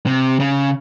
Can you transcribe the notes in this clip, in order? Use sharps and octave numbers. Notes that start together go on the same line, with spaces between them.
C3
C#3